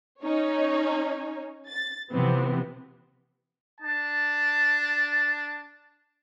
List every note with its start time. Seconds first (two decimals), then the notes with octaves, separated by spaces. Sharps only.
0.23 C#4 D#4 C#5
1.69 A6
2.11 C3 E3 F3 B3 C4
3.81 D4 A5